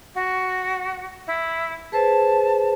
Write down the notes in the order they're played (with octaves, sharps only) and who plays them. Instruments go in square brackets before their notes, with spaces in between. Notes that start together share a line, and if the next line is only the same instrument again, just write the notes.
[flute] F#4
E4
[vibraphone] G#4 B4 C5 [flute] A5